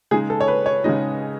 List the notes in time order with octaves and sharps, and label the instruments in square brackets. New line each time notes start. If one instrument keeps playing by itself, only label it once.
[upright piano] C#3 G#3 D#4 G#4
A4
C#5
B4
C#5
C#3 G#3 D#4 D#5